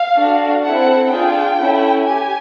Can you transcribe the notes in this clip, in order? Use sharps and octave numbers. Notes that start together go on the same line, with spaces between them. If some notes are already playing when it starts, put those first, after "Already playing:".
Already playing: F5
D4 F#4 A4
C4 E4 A4 F#5
D4 F4 G#4 G5
C#4 E4 A4
G4 G#5